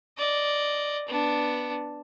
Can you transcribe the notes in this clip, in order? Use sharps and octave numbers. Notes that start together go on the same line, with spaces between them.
D5 D#5
B3 D4